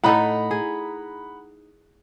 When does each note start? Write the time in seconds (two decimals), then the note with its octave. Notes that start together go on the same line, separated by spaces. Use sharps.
0.04 A2 D#4 A4 F#5 A#5 B5
0.51 G#4